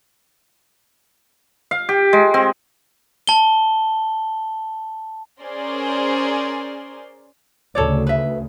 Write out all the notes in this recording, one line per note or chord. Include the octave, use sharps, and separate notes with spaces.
F5
G4
G#3
C4
A5 G7
C#4 G#4 A#4 C5 D5 C6
D2 C#3 A4 C#5 D5
B4 E5